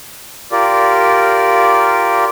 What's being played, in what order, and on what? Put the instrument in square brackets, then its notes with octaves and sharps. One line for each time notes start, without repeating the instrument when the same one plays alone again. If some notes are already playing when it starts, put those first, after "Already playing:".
[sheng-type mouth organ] F4 G4 A#4 D5